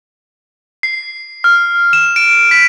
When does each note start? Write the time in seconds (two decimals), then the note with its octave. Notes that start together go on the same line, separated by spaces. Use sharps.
0.83 C7
1.44 F6
1.93 E7
2.16 D7
2.51 B6